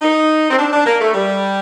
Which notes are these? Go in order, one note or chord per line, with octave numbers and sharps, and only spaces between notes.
D#4
C4
D4
D4
A#3
A3
G3